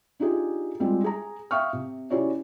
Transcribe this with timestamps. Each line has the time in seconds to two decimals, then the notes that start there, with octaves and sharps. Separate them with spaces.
0.20 D4 D#4 F4 G4 G#4
0.80 G3 G#3 C4 F4 F#4
1.04 G#4 A#5
1.51 E5 F5 G5 C#6 D#6 F6
1.73 C3
2.10 C#4 E4 F#4 G4 C#5 D5